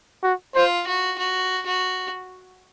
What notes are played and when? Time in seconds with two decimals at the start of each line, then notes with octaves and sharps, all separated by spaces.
0.23 F#4
0.55 F4 C5
0.87 F#4
1.18 F#4
1.66 F#4